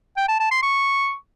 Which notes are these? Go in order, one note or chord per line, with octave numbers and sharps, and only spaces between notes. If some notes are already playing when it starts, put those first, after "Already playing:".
G5
A5
A5
C6
C#6